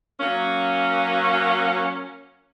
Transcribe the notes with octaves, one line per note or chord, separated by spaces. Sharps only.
F#3 A#3 C#4